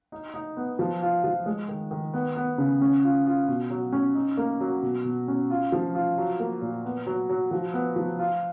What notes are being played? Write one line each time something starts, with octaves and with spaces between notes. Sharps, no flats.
D#4
D#4
B3
F3
F4
F3
G#3
D#3
D#3
B3
B3
C#3
C#4
F4
F4
B2
F#3
C#4
D#4
A#3
F#3
B2
B2
C#4
F4
F3
F4
F#3
A#3
A#2
B3
F#3
F#3
F3
B3
F3
F4